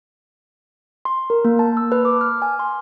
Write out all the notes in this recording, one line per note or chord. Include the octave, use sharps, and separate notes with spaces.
C6
A#4
A#3
A5
E6
B4
D6
F6
G#5
C6